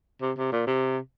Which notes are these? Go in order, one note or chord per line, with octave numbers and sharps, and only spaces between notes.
C3
C3
A#2
C3